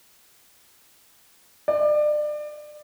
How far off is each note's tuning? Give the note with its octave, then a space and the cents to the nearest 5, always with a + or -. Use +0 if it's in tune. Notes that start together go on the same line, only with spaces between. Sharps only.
D5 +30